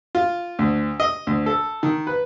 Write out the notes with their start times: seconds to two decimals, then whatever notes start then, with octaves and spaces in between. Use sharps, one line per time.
0.15 F4
0.59 D2
1.00 D#5
1.27 D2
1.46 A4
1.83 D#3
2.07 B4